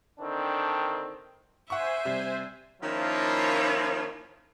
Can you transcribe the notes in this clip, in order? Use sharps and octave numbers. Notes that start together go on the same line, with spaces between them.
D3 D#3 C4 D4
C5 E5 F#5 G#5 C#6
C3 G3
D#3 F3 A#3 C#4 E4 F4